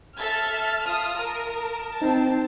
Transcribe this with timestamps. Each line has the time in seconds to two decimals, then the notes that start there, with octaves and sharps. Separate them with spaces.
0.17 A4 E5 F6 A6
0.85 F4 A5 D#6
1.18 A#4
1.56 A5
2.02 C4 D#4